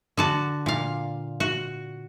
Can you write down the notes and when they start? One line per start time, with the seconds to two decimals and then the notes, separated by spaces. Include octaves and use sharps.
0.17 D3 F#4 A5
0.66 A#2 F5
1.40 F#4